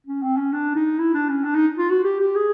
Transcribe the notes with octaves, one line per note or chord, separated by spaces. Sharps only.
C#4
C4
C#4
D4
D#4
E4
D4
C#4
D4
D#4
F4
F#4
G4
G4
G#4